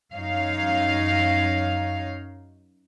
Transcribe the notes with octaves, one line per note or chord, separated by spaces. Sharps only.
F#2 D#4 C#5 F5